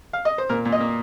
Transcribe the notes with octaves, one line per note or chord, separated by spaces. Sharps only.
F5
D#5
C5
A#2 A#4
A#2
D#5
A#3